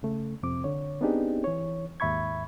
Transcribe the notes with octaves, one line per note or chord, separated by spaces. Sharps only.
C#3 A3
F2 C3 C4 D6
D3 C#5
B3 C4 D4 D#4 G4 G#4
E3 C#5
D#2 G#2 E5 B5 C#6 G#6